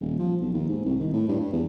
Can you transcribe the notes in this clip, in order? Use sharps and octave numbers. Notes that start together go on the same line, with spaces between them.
D#1
F3
B1
D#2
G#2
C2
D#3
A2
G2
G2
E2